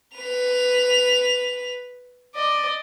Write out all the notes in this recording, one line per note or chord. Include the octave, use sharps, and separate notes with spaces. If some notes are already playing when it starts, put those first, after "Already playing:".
B4 F7
D5 D#5